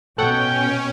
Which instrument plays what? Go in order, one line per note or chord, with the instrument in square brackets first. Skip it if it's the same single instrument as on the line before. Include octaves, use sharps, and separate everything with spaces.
[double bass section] B2 [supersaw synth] C#4 [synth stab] A4 F#5 [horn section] C#5 G5